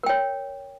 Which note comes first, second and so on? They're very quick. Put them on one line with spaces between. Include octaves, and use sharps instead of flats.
A#4 G5 C#5